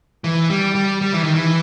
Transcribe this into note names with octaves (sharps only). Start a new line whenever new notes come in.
E3
G3
G3
G3
E3
D#3
E3